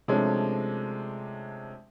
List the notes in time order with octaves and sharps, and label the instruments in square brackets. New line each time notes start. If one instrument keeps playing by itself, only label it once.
[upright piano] C3 F3 G#3 A3 C#4 D4